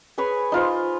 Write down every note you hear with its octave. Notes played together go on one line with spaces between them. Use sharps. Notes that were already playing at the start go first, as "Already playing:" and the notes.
G#4 B4 C#5 G#5
D#4 F4 C5